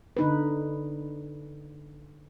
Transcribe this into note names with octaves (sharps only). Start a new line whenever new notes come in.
D3 D#4 B4